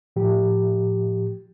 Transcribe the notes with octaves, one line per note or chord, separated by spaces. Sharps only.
A2 F3 G4